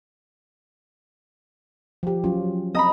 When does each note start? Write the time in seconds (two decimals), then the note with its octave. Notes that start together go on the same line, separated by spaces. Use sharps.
2.03 F3 G4
2.24 F#3 C#4 F4
2.75 C4 D#5 A#5 B5